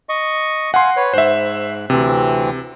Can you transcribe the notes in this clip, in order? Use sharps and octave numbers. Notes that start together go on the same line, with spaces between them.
D#5 C#6
F5 F#5 G#5 C6
B4 C#5
G#2 C5 E5 F#6
D2 C3 E3 C4